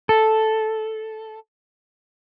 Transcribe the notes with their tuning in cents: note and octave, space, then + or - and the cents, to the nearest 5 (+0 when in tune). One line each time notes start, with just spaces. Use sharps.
A4 -5